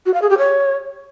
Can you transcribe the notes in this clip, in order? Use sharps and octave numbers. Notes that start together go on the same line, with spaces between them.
F#4
F5
G#4
G4
C#5